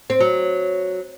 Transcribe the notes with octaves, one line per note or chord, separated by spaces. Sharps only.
C4
F#3